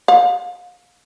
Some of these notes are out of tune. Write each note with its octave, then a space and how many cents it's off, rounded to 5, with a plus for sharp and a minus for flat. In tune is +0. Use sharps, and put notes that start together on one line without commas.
F5 +35